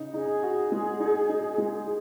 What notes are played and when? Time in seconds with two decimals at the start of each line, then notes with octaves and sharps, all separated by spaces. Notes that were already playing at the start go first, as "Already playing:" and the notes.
Already playing: C#3 D#4
0.13 D#4 G#4
0.43 F#4
0.72 G#3
1.00 D#4
1.29 D#4
1.58 G#3